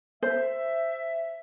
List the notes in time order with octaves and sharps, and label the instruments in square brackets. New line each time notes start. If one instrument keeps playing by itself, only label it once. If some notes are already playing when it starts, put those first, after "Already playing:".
[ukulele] C5 [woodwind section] E5